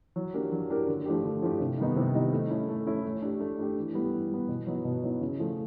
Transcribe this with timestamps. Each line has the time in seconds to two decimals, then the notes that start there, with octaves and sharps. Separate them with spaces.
0.16 F#3
0.34 A#3 D4 G4 A#4
0.52 F#3
0.70 A#3 D4 G4 A#4
0.88 D3
1.06 F3 A3 D4 G4
1.24 D3
1.42 F3 A3 D4 G4
1.60 C3
1.78 D#3 G3 B3 D#4
1.96 C3
2.14 D#3 G3 B3 D#4
2.33 A3
2.50 C#4 E4 A4
2.69 A3
2.86 C#4 E4 A4
3.05 A3
3.22 D4 G4
3.40 A3
3.58 D4 G4
3.76 E3
3.94 G3 B3
4.13 E3
4.31 G3 B3
4.49 B2
4.67 F#3 B3 D#4
4.85 B2
5.03 F#3 B3 D#4
5.21 C#3
5.39 F3 A3